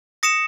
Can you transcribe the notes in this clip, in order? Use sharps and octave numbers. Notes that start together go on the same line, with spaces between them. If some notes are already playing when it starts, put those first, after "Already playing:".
D#6 A#6 C#7 E7